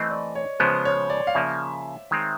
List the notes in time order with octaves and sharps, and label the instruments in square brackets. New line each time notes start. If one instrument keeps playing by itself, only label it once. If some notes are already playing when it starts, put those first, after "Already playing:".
Already playing: [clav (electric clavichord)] E3 A3 C4 [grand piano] D#5
[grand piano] D5
C#5
[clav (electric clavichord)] C#3 F3 G#3 B3 [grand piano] C5
[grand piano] C#5
D5
F5
[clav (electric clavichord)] C#3 F3 A#3 [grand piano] E5
[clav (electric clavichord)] D#3 G#3 C4